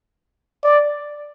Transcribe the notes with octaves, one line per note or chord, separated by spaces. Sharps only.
D5